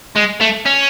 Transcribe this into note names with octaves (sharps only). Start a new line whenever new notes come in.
G#3
A3
C#4